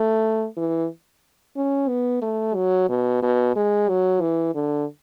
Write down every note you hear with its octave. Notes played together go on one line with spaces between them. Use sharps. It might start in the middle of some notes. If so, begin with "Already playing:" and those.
Already playing: A3
E3
C#4
B3
A3
F#3
B2
B2
G#3
F#3
E3
D3